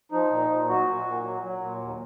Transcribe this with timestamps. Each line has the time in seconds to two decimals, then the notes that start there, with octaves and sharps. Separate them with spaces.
0.12 F3 D#4
0.30 A#2
0.50 A#2
0.69 F#3 F#4
0.87 A#2
1.06 A#2
1.24 F#3
1.43 F#3
1.61 A#2
1.80 D#2